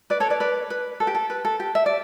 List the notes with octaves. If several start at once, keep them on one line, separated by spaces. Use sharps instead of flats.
B4 D5
A4 C#5
B4 D5
B4 D5
B4
A4
G4
A4
B4
A4
G4
E5
D5